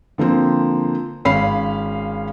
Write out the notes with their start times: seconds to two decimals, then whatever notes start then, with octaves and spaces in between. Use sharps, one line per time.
0.18 D3 F3 A#3 C4
1.25 G#1 C#4 F5 B5 C7